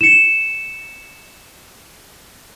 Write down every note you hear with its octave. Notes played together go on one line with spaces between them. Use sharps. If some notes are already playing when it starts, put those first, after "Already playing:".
C#7 E7